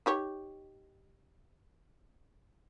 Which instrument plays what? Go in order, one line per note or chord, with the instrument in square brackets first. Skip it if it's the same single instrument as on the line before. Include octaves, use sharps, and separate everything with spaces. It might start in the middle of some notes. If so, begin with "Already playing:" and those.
[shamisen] D#4 G4 C#5